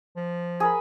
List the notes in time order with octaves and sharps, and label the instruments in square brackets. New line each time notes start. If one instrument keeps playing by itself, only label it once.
[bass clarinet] F3
[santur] G#4 A#4 B5